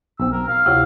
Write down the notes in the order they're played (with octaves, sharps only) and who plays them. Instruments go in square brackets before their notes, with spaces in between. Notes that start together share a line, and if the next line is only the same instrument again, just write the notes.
[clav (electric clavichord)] B1 C4 [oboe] E6
[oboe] A#4
F5
[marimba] D2 C3 E4 [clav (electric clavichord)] F4 G4 C#5